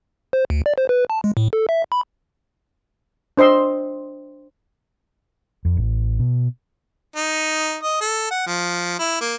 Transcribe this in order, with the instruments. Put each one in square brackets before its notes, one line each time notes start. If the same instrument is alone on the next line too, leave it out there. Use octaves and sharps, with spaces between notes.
[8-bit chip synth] C5
D2
D5
C5
B4
A5
G#3
A2
A4
E5
B5
[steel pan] D4 C5 D#5 C6 E6
[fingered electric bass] F2
A1
B2
[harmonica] D#4
D#5
A4
F#5
F3
E4
A#3